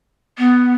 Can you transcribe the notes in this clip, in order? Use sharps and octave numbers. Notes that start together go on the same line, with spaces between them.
B3